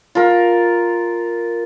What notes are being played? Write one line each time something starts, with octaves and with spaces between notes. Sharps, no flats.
F4 A#4